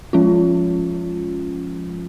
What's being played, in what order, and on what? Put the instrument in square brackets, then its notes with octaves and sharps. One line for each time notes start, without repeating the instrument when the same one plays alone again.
[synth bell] F3 G#3 C#4 F4